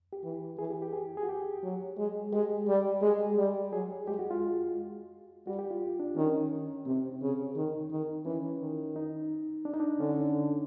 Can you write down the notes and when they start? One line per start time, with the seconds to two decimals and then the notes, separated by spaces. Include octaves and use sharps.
0.13 G4
0.24 E3
0.59 E3 G#4
0.70 G4
0.82 G4
0.93 G#4
1.17 G#4
1.23 F#4
1.29 G4
1.63 F#3
1.98 G#3
2.33 G#3 G4
2.68 G3
3.02 G#3 G#4
3.37 G3
3.72 F#3 G#4
4.07 G#3 G4
4.19 F#4
4.31 F4
4.42 G#3
5.47 G3 F#4
5.59 G4
5.71 F4
6.00 D4
6.17 D#3 C#4
6.86 C3 C4
7.22 C#3
7.56 D#3
7.91 D#3
8.26 E3 C#4
8.61 D#3
8.96 D#4
9.65 D4
9.73 D#4
9.80 D4
10.00 D3 C#4